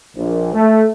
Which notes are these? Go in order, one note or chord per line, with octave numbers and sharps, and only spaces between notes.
A#1
A3